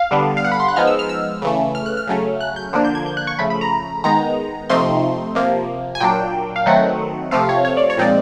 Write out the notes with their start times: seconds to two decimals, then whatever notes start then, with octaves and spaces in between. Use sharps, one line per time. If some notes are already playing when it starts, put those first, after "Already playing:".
Already playing: F5
0.11 D3 G3 B3 D4
0.37 F5
0.45 F#5
0.52 B5
0.60 C6
0.68 F#6
0.76 F3 G#3 B3 D#4 F6
0.87 E6
0.99 F6
1.09 E6
1.42 C#3 E3 A3
1.75 F6
1.86 F#6
1.97 F6
2.07 C#3 F#3 A3 C#4
2.40 F#6
2.56 G6
2.73 D3 F3 A#3 D4
2.85 G6
2.95 G#6
3.06 G6
3.17 F#6
3.27 C#6
3.39 C#3 F3 A3 B5
3.50 B5
3.61 A#5
4.04 D#3 G#3 B3 D#4 A#5
4.70 C3 F3 A3 C4 D#4 C6
5.35 C3 F3 A#3
5.95 G#5
6.00 A#2 F#3 A#3 D4 G5
6.56 F5
6.66 D#3 F#3 A3 C4 D#4 F#5
7.31 C3 F3 A3 C4 F5
7.49 C#5
7.65 C#5
7.77 D5
7.90 C#5
7.97 A#2 F3 G#3 C4 D#4 D5